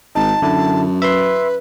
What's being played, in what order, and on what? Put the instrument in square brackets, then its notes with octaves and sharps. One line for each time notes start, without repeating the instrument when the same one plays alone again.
[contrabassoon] G#1 [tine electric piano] D#4 [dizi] A5
[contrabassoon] F#2 [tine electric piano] D3 E4
[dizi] B4 [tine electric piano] E5 B5 C6